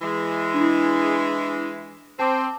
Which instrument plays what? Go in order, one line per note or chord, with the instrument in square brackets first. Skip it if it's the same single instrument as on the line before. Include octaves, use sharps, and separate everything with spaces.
[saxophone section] E3 G#3
[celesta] D4 E4
[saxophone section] C4 [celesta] A5 D6